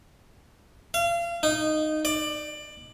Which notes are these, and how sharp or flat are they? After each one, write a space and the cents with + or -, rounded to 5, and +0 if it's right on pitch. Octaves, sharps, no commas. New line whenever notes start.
F5 -35
D#4 -10
D5 +20